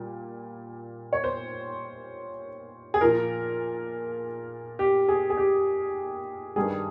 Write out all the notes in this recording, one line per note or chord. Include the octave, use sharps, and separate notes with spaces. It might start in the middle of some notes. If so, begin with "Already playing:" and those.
Already playing: A#2 G3
C#5
C5
G#4
A#2 F3 A#4
G4
G#4
G#4
G4
G2 D#3 G3 G#4